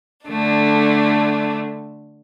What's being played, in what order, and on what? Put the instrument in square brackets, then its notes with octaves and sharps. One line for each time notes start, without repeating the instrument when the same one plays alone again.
[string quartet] D3 A3 D4